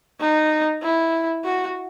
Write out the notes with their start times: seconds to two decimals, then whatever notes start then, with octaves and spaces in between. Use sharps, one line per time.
0.20 D#4
0.82 E4
1.44 F#4